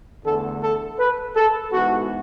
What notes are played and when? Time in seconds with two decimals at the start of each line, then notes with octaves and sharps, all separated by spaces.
0.23 E2 D3 A3 A4
0.61 A4
0.99 B4
1.36 A4
1.72 G#2 E3 B3 F#4